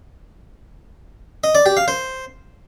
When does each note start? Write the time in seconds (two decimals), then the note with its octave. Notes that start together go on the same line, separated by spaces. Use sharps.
1.44 D#5
1.55 D5
1.66 G4
1.77 F5
1.88 C5